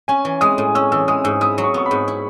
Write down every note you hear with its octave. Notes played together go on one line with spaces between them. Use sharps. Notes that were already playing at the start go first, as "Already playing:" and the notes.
C#4 G#5
E3
G#3 D#6
A2
C#4 E6
E3 E6
G#3 D#6
G#2 E6
E4 D#6
F#3
C#6
B3 C#6
B5
G#2
E4